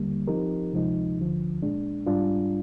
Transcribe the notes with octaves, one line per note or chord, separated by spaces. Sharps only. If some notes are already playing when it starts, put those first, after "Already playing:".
Already playing: D#2 D3 G3 A#3
F3 C4 D#4 G4 A#4
D2 C3 F3 G#3 D#4
D2 D3 F3
A#2 G#3 D4
G#2 G3 D4 F4